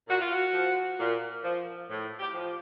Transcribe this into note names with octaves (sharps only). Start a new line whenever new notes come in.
A#2 F#4
F4
F#4
F3
A#2
F3
A2
G4
F3